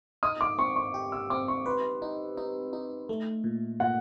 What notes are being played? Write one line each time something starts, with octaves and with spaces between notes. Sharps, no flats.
D#4 D#6
D6
C4 C#6
C#6
G4
E6
C4 D6
C#6
B4 C6
D#4
D#4
D#4
A3
A#2
A#2 F#5